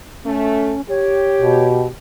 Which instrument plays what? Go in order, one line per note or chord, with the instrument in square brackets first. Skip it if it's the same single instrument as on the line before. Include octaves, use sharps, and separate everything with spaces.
[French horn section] A3 [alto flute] C#4
[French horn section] G4 [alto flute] C#5
[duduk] B2